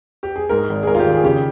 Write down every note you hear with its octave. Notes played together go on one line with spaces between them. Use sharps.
G4
G#4
G#2 A#4
G#1
G#4
G#2 A#4
F4
G4
D#3
G#4
C#3 G4